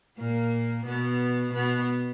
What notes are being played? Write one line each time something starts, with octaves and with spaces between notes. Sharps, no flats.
A#2 A#3
B2 B3
B2 B3